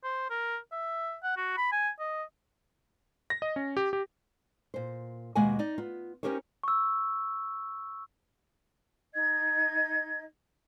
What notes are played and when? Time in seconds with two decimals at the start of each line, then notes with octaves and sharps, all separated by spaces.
0.04 C5
0.30 A#4
0.72 E5
1.23 F#5
1.37 F#4
1.57 B5
1.72 G#5
1.99 D#5
3.30 A#6
3.42 D#5
3.56 C#4
3.77 G4
3.93 G4
4.74 A#2 C5
5.35 D#2 B2 G#3 A#3 F#5 G#5
5.59 D#4 D5
5.78 B3 F4
6.23 C#4 D#4 G4 A#4 C5 C#5
6.64 C#6 E6
9.14 D#4 D#5 G#6